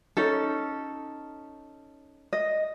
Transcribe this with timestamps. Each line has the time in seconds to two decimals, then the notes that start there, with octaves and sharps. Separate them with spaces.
0.17 C#4 D#4 A4
2.33 D#5